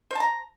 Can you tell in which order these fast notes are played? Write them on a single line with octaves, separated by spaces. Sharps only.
C5 A5 A#5